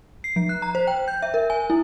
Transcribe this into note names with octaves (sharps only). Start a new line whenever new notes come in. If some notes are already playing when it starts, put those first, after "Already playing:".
C7
F3
F#6
A#5
C5
G5
G6
E5
A#4
G#5
E4